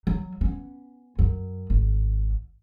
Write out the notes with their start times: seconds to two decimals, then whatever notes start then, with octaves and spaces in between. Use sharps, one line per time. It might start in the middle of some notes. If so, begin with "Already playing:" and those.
0.07 F#3
0.41 B3 C#4
1.19 F#2
1.70 G#1